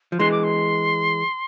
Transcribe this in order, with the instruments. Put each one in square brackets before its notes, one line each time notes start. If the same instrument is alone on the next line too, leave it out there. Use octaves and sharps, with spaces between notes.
[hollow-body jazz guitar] F3
[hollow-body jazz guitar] E3 G#3 [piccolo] C6
[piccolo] D6
C6